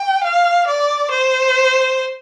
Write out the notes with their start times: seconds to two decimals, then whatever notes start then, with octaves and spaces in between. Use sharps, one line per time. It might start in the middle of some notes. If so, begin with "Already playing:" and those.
Already playing: G5
0.24 F5
0.68 D5
1.11 C5